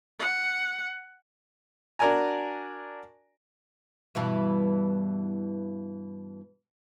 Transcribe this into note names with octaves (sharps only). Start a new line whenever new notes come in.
F#5
D4 F#4 A#4 D5 G#5 A#5
G2 B2 E3